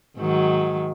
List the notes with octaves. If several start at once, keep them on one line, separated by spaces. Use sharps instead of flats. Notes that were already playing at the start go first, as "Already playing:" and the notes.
G#2 D#3 F#3